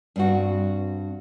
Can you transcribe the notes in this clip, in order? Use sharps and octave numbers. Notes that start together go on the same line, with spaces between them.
G2 C4 F#4